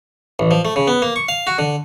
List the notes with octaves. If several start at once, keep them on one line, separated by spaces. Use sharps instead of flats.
A1
F3
A3
C#3
B3
A#3
C#6
F5
F#4
D3